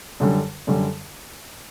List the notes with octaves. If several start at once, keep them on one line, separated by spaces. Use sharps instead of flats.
F#2 D3 G3
F#2 D3 G3